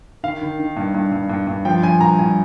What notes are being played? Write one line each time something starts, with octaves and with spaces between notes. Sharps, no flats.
D#3 F5
D#3
D#3
G2
G2
G2
G2
G2
F3 G5
F3 G#5
G2 A#5
G2 G#5